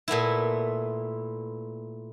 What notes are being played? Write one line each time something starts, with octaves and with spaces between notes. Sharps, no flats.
A#2 A3 B3 E4